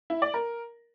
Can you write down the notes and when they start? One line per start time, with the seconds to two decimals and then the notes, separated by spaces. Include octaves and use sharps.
0.10 E4
0.22 D5
0.34 A#4